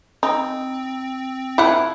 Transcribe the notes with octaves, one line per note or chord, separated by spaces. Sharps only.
C4 D#4
D#3 F3 E4 F#5